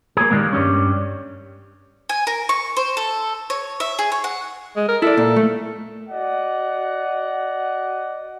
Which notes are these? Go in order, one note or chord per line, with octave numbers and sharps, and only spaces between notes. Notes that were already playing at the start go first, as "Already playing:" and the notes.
A#3 G#4
D#3 E3 G3 G#3 A#3
G2 G3 C#4
G#5
A#4
C#6
C5
A4
C#5
E5
G#4
C#5
F#5
G#3
A#4
E4 A4 D5
A#2
A3
F#4 D5 D#5 F#5